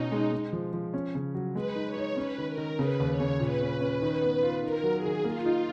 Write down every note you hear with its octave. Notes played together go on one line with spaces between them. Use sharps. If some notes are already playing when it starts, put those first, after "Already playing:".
Already playing: B2 C#4 D#4
G#3
G#3
F3
F3
C#4
C#3
F#3
G#3 B4
D#4
C#5
D#4
C#4 B4
D#3
A#4
D#3
C#3 B4
D#2
C#5
C#3
A#2 B4
C#4
C#4
D#3
B3
F4
D#3 A#4
F#3
G#4
D#3
A#3 F4
D#4